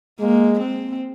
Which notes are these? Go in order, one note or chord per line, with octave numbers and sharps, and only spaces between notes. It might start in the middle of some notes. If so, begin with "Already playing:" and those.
G#3 A#3
C4